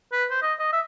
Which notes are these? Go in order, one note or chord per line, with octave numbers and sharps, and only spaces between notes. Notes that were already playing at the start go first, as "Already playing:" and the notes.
B4
C5
D#5
D#5
E5